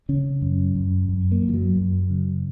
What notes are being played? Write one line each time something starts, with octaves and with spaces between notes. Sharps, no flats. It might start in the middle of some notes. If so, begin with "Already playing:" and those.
C#3 C#4
F#2
F#2
F#2
A#3
F#2
E3
F#3
F#2
C#3